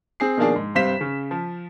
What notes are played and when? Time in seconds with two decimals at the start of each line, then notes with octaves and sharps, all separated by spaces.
0.20 C4 G#4 C7
0.37 B2 D#3 F3 A#3 D4 G#4
0.56 G#2
0.75 G2 C3 C5 F5 B6 E7
1.01 C#3
1.31 F3